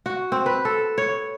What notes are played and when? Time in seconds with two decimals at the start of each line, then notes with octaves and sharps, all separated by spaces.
0.06 F#4
0.32 C4
0.46 B4
0.65 A4
0.98 C#5